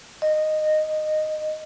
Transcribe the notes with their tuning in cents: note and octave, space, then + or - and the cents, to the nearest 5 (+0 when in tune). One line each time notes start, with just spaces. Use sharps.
D#5 -10